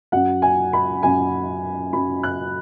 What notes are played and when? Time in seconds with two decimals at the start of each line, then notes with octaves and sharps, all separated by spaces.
0.12 F#2 F#3 F#5
0.42 G#5
0.73 B5
1.03 F#2 F#3 G#5
1.93 F#2 F#3 B5
2.23 F#6